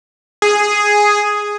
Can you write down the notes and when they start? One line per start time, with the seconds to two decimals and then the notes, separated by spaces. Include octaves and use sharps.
0.42 G#4